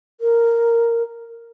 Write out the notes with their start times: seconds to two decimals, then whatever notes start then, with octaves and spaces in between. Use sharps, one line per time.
0.21 A#4